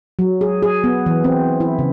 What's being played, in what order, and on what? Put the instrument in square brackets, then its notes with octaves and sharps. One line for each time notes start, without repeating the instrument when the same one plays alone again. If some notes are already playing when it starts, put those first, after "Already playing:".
[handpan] F#3
G#4
G#4
B3
E3
C4
E4
C#3